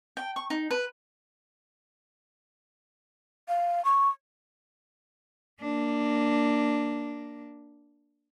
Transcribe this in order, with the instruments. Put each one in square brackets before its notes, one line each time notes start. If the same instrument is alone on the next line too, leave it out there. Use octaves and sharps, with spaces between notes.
[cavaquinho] G5
C#6
D#4
B4
[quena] F5
C#6
[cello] A#3 D4